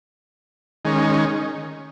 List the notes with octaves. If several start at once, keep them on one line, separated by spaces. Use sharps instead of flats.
D#3 G#3 C#4